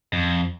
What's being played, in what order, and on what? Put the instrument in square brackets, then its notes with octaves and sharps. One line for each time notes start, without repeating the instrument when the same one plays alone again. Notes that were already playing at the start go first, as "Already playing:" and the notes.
[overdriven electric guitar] F2